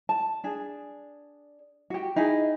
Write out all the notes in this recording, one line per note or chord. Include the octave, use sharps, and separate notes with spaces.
A5
D4 G#4
F#4 G4
D#4 E4 G#4